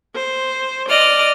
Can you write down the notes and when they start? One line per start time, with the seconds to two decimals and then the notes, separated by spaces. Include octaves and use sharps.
0.16 C5
0.89 D5 D#5 F6